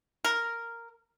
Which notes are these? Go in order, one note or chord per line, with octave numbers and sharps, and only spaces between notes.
A#4